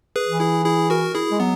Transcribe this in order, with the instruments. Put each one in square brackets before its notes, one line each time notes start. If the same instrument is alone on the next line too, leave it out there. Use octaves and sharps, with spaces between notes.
[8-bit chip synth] G#4 B4
[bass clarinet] E3
[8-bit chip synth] E4 G#4
E4 G#4
F#4 A#4
E4 G#4
[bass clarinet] G#3
[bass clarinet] F#3 [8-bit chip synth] B3